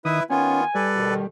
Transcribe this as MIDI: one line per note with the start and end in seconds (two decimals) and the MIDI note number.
0.05 0.20 51
0.05 0.23 64
0.05 0.23 71
0.05 0.23 76
0.05 0.20 87
0.30 0.64 51
0.30 0.64 59
0.30 0.61 61
0.30 0.64 65
0.30 0.88 80
0.75 1.27 55
0.75 1.14 69
0.75 1.14 71
0.75 1.14 74
0.96 1.22 38
0.96 1.22 47
0.96 1.22 51